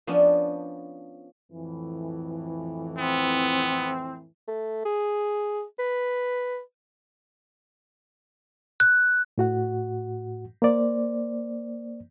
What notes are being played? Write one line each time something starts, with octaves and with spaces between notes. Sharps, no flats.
F3 B3 C#4 D4
F2 A2 E3
B3 C4
A3
G#4
B4
F#6
A2 F#4 F#5
A#3 C5 D5